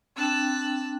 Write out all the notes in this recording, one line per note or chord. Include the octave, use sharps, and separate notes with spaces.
C4 D4 G5 A5 E6 F#6